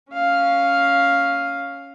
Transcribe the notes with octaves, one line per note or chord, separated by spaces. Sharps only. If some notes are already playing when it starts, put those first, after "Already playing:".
C#4 F5